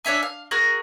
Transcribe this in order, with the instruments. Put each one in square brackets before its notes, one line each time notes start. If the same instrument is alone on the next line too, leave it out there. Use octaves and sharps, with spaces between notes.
[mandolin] D4 C#5 E5 G#5
F5
F#4 G#4 A#4